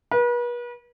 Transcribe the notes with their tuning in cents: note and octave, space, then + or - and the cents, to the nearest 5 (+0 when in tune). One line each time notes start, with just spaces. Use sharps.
B4 -40